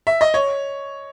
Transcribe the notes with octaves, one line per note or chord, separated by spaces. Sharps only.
E5
D#5
C#5